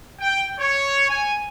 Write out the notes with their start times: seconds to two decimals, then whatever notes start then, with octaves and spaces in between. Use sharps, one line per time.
0.20 G5
0.60 C#5
1.10 G#5